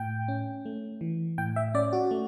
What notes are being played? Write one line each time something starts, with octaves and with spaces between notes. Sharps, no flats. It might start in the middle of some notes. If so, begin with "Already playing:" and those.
Already playing: A2 G5
C#4
A3
E3
A2 G5
E5
C#4 D5
F#4
A3